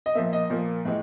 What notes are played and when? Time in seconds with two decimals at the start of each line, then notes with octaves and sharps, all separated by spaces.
0.06 D#5
0.15 A#2 F3 A#3 E5
0.33 D#5
0.50 A#2 F3 A#3
0.85 A2 E3 G#3